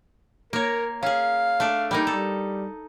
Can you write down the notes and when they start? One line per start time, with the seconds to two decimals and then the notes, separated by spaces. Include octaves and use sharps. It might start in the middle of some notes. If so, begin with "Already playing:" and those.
0.53 A#3 A#4 C#5
1.03 C#4 G#4 F5
1.60 A3 D4
1.91 G3 A#3 D#4
2.07 G3 A4